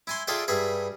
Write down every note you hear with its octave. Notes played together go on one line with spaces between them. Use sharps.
E4 G#5 C6
F4 G#4 A4 D5 E5 G5
G2 G#4 E5 B5